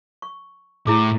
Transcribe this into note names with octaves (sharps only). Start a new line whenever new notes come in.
C#6
A2 E4 G#4 D6